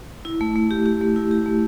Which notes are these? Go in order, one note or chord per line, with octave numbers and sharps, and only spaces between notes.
E4
A3
A3
G4
G4
A3
E4
G4
A3